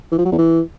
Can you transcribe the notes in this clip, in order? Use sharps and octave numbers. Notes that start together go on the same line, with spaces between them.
E3
F3
F#3
E2
E3